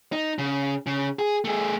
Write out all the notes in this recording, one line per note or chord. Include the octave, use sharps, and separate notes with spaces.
D#4
C#3
C#3
G#4
A3 G#4